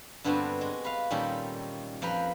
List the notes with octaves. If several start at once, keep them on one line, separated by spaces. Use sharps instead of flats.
G2 D3 B3 C4 F#4 A5
G#3
B4 F5
A#2 D#3 G3 C#4 A4
F2 F3 A#4 B4